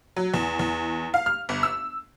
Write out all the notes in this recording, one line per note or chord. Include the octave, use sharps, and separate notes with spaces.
F#3
E2
E2
F5
F6
G1
E6